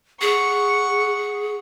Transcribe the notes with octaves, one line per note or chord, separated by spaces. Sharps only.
G#4 F#5 C#6